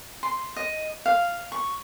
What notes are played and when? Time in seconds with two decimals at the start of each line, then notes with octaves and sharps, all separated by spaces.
0.23 C6
0.56 D#5
1.06 F5
1.52 C#6